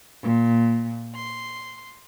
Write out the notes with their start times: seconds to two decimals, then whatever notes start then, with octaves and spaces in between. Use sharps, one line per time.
0.22 A#2
1.16 C6